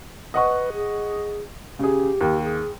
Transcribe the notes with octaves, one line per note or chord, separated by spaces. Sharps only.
B4 D#5 F#5 C#6
G#4
C#3 G4 G#4
D#2
G#4